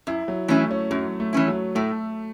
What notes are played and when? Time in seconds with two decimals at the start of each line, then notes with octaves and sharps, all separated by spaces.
0.07 F#2 E4
0.28 F#3
0.48 E3 A3 C#4 E4
0.71 C#4
0.91 F#2 F#3
1.20 A3
1.33 E3 C#4 E4
1.48 F#3
1.75 A2 A3